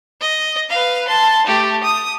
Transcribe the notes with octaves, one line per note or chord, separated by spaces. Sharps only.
D#5
B4 F5
A5 C6
A3 G4
D#6